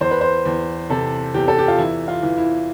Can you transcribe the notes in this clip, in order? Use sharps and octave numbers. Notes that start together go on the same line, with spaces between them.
E2 C5
B4
C5
E2
C3 A4
E2 G4
A4
G4
F4
E3 E4
F4
E3
E4